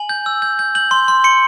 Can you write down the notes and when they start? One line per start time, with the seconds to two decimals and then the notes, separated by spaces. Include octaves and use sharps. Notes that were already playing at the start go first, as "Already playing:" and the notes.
Already playing: G#5 F#7
0.09 G6
0.26 E6
0.42 G6
0.59 G6
0.75 G6 F#7
0.91 C6
1.08 C6
1.24 C6 C#7